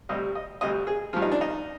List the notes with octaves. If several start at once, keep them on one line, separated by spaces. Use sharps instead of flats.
D2 C3 G3 D#5
D#5
D2 C3 G3 D#5
G#4
G2 F3 F4
D#4
D4
D#4